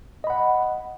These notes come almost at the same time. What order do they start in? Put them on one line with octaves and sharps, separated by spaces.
D#5 B5 F#5